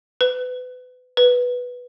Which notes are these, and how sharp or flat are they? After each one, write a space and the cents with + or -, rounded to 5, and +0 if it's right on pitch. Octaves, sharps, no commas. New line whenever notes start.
B4 +30
B4 -5